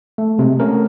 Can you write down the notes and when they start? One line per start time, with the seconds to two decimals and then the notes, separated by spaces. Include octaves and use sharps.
0.18 A3
0.39 C3 G#3
0.60 A3 C#4 A#4